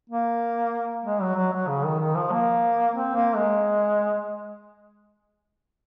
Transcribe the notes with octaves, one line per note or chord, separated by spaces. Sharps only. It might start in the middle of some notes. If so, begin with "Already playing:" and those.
A#3
G#3
F#3
F#3
F#3
C#3
D#3
D#3
F3
A#3
C4
A#3
G#3